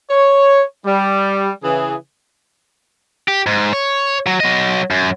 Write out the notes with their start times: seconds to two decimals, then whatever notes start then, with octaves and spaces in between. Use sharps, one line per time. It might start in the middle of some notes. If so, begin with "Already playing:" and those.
0.10 C#5
0.86 G3
1.64 C#3 E3 G#4
3.28 G4
3.46 G#2
3.73 C#5
4.26 F#3
4.40 F#3 D#5
4.91 F#2